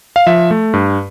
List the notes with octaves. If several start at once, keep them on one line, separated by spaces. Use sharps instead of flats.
F5
F3 E5
A3
G2